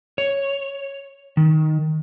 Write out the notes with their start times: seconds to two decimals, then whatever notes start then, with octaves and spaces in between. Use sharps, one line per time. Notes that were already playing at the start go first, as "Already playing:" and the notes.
0.18 C#5
1.37 D#3